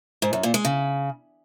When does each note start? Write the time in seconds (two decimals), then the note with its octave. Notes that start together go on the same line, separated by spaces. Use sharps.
0.22 G#2
0.33 F#2
0.43 A#2
0.54 G#3
0.65 C#3